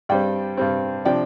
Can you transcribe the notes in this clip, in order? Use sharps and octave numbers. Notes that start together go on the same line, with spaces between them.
G2 G3 C4 D5 G5
G2 G3 C4
C3 F3 D4 D5 G5